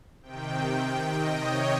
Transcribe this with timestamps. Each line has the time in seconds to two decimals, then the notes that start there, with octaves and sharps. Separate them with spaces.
0.23 C3 D#3 G5
1.12 D#5
1.42 C#5